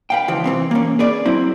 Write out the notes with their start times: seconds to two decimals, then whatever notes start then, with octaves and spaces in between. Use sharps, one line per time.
0.10 B4 F5 G5
0.28 C#2 E3 F3
0.46 C3 E3 C4
0.71 A#3 C#4
0.99 G#4 B4 D5
1.26 F#3 C4 E4